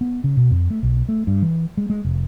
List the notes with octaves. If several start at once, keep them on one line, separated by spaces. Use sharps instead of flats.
B3
C#3
B2
F2
A3
B1
A3
G2
E3
G#3
G#3
F1